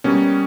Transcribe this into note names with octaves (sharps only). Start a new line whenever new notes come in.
B2 G3 A#3 C#4